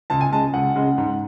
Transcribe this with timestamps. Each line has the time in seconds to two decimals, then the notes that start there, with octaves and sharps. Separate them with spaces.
0.10 C#2 A5
0.21 G#5
0.32 C#3 G#3 A5
0.54 C#2 F#5
0.75 C#3 G#3
0.98 G#2